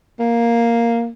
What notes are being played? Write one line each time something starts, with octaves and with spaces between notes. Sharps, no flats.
A#3